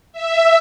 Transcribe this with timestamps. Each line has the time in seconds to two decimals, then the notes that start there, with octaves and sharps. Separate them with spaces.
0.13 E5